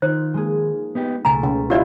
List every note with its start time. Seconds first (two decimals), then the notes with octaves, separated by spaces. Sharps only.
0.02 D#3 D#4 F4 C5
0.34 G#3 A#3 G#4
0.95 B3 D#4 G4
1.25 C#2 B2 A3 G#5 A#5
1.43 C#3
1.70 E4 F4 G4 D5 D#5